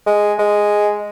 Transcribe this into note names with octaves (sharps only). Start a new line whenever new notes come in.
G#3
G#3